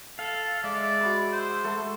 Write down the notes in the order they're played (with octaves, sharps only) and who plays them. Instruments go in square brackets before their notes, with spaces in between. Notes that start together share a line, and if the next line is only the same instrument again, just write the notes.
[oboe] A4 [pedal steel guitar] F5
[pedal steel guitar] G#3 E5 [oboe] D5
[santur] F#4 B5 C6
[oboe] C5
[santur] A3 A4